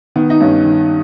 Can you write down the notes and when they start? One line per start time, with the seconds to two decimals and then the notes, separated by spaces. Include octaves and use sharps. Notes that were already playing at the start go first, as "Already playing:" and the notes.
0.16 D#3 B3
0.30 D#4
0.40 G2 C#4
0.65 D#3